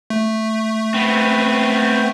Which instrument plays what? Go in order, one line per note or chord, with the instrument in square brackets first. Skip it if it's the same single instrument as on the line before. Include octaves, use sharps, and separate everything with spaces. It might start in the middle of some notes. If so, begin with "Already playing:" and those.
[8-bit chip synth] A3
[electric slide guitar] B3 C4